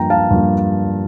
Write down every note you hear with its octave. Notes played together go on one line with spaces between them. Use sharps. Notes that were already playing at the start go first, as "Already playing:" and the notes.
Already playing: G2 F3 A#3 G5 A#5
F5 A5
G2 F3 A#3